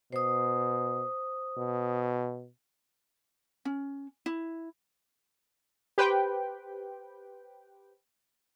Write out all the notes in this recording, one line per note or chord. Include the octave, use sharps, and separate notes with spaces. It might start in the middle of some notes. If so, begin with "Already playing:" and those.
B2 C5 D#6
B2
C#4
E4
G4 B4 C5 G5